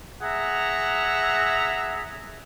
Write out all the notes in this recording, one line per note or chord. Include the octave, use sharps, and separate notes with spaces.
G#4 E5 F#5 A#5